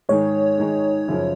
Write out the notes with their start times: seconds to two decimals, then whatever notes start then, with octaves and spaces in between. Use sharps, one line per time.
0.09 G#2 D#3 G#3 D#4 G#4 C#5
0.58 G#2 D#3 G#3 D#4 G#4
1.08 F#2 C#3 F3